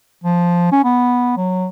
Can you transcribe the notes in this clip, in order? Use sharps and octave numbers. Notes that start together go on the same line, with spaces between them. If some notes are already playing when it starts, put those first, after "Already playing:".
F3
C#4
B3
F#3